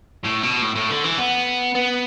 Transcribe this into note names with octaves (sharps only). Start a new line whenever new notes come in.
A2
B2
A2
A2
D3
E3
B3
B3